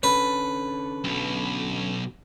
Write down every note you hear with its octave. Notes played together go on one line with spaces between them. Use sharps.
D3 C#4 A4 B4
B1 B2